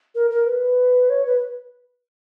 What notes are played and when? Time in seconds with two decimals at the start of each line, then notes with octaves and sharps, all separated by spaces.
0.15 A#4
0.31 A#4
0.46 B4
1.10 C#5
1.26 B4